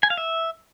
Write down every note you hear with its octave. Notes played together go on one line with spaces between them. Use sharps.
G#5
F5
E5